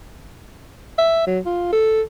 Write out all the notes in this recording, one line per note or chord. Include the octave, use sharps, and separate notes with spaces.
E5
F#3
F4
A4